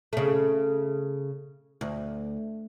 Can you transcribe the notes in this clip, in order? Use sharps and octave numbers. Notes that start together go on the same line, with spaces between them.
C#3 A3
D2